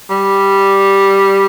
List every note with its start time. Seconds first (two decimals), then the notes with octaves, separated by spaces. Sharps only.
0.10 G3